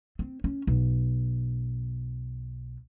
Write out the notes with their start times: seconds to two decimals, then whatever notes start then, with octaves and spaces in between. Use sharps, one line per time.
0.19 C4
0.44 C#4
0.67 B1